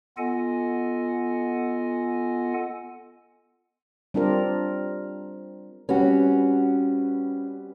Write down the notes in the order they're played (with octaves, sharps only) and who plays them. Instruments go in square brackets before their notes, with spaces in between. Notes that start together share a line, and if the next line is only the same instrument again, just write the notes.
[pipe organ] B3 F4 A4 D#5 F#5 G#5
[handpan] G3 C4 D4 F4 A#4
[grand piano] G3 C4 B4 [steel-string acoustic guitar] C#4 F#4